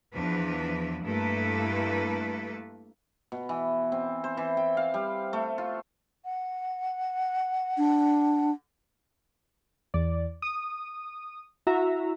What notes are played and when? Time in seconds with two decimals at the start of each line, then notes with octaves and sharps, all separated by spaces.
0.14 E2 F3 D4 B4
1.03 G2 A3 A#3 E4 A4 B4
3.32 B2
3.49 E3
3.92 C4
4.24 C5
4.37 E3
4.57 G5
4.77 F5
4.94 G3
5.33 A3
5.58 F4
6.24 F#5
7.78 D4
9.94 E2 D5
10.42 D#6
11.67 E4 F#4 E5 A#5